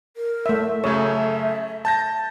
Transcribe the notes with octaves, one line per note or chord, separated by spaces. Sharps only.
A#4
A3 E5
F#2 C#3 A3 C#5 E5
A5 G6 A#6